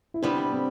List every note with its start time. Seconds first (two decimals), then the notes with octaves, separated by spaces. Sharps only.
0.14 E4
0.22 C3 G3 B3 D4
0.53 C4